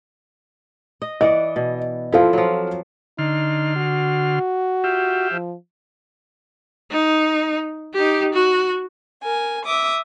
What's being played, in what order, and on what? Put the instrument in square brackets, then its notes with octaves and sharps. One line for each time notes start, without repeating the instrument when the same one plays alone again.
[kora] D#5
[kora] E3 D5 F#5 [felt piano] D#5
[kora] B2
[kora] F3 C4 E4 [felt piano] F4 A4 F5
[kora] F3 F#3
[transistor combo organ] D3 C6 F6 [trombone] D#4
[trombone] F#4
[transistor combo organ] F4 G4 E5
[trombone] F3
[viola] D#4
D#4 G4
F#4
[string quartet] A#4 G#5
E5 D6 D#6